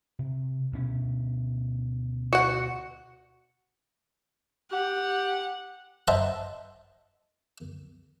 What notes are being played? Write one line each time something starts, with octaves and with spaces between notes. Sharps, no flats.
C3
D2 B2 C#4
F#4 F#5
G4 F#5
C5 D#5 E5 F#5 A5 A#5